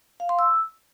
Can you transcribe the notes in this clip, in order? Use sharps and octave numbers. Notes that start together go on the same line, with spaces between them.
F5
C6
E6